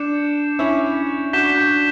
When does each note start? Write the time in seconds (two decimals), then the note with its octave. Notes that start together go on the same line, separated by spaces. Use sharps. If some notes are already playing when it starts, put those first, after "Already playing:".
Already playing: D4 G6 C#7 E7
0.59 C#4 E4
1.33 D4 F#4 G6 B6 E7 G7
1.58 D4